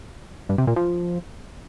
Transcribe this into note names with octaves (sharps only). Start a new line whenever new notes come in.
G2
C3
A#2
F3